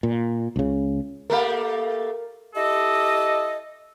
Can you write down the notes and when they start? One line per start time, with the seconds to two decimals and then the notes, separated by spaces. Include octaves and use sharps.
0.03 A#2
0.56 C#2 C#3
1.30 A3 A#3 G4 A#4 F5
2.56 E4 G4 A4 D#5